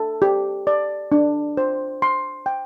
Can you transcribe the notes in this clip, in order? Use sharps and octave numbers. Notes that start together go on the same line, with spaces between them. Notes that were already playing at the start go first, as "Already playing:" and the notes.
Already playing: A4
G4
D5
D4
C5
C6
G5